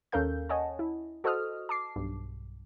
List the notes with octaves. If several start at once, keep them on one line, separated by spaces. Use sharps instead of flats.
D#2 C#4 A4 A#4 F5 G6
C#5 D#5 F#5 G#5 A5
E4
F#4 A4 C5 D#5 D#6 F6
A5 D6 C7
B1 G2